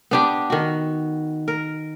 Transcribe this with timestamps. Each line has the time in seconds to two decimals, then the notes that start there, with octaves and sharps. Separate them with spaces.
0.11 B3 D4 G4
0.50 D#3 F#4
1.48 A#4